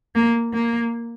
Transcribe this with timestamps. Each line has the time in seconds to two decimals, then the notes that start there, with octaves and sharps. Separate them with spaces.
0.15 A#3
0.54 A#3